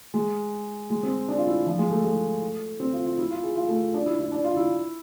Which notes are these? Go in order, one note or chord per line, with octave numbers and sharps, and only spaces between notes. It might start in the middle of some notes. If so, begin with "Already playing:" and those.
G#3
G#3
C4
D4
F4
E4
F3
G#3
A3
A3
C4
F4
F4
E4
F4
G#4
F4
A3
D4
E4
E4
D4
F4
E4